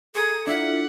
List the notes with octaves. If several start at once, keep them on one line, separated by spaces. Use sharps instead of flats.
G#4 A4 A#5 D#6 C#7
D4 E4 F4 E5 F#5